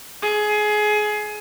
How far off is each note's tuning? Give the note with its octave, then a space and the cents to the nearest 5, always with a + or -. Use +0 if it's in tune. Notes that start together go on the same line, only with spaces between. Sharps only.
G#4 +20